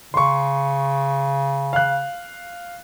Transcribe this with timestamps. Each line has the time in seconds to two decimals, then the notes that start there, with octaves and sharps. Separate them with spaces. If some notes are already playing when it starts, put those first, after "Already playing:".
0.14 C#3 C6 C#6
1.73 F5 F#6